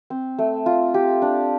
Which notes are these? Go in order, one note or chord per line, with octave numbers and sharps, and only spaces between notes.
C4
A3
F4
G4
D4